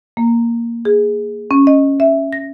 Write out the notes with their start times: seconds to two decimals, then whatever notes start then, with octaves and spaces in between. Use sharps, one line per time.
0.17 A#3
0.85 G#4
1.51 C#4
1.67 D#5
2.00 E5
2.33 A#6